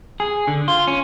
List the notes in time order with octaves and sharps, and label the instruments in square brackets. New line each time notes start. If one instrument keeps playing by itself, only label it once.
[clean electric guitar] G#4
D3
F4
C#4